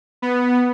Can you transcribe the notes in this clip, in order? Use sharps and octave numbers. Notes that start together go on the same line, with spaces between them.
B3